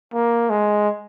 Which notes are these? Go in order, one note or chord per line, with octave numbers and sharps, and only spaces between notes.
A#3
G#3